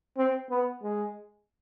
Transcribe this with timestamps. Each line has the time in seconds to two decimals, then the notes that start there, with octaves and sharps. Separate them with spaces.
0.17 C4
0.50 B3
0.82 G#3